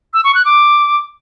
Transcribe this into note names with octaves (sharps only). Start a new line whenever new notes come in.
E6
C#6
F#6
D6